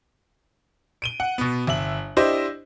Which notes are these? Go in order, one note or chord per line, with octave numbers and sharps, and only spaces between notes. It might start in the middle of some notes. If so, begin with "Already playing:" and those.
D7 D#7 G7
F#5
B2 B3
G1 E5 F#7
D4 E4 G4 C5 D#5